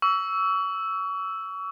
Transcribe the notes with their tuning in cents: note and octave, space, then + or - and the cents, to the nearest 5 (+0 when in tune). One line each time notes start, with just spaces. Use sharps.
C#6 +35 E6 +0